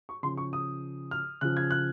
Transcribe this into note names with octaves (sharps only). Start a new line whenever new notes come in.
C#6
C#3 F3 C6
C#6
D#6
F6
C#3 F3 F#6
G#6
F#6